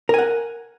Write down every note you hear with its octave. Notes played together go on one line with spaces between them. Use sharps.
A#4 F#5 G#5